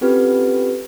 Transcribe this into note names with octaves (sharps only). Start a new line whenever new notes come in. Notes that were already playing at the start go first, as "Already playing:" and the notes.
C4 C#4 F4 G4 A4 B4